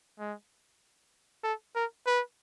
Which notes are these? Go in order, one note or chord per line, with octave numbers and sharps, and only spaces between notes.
G#3
A4
A#4
B4